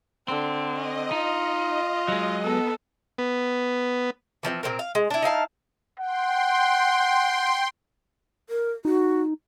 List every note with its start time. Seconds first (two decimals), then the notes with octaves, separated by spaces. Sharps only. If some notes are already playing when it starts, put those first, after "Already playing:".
0.28 D3 C4
0.71 D#5
1.12 D#4 F4
2.08 F#3 G#3
2.43 B3 A4
3.18 B3
4.43 E3 F3 G#3 C4
4.63 A#2 G#3 C4 A#4
4.79 F5
4.95 G#3
5.10 D4 E4
5.22 D#4 E4 F5 A5
5.99 F#5 G5 C6
8.49 A#4
8.85 D#4 F#4